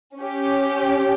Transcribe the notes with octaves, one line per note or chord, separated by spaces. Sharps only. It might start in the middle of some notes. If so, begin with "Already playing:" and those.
C#4 G4